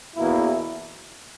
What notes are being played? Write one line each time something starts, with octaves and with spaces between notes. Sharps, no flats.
E2 B2 A#3 E4